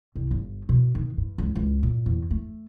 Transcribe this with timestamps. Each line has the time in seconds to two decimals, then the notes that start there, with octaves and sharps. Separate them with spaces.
0.16 C2
0.31 G1
0.69 B2
0.95 D#3
1.17 G2
1.38 C#2
1.55 C#2
1.83 A#2
2.06 E2
2.31 A3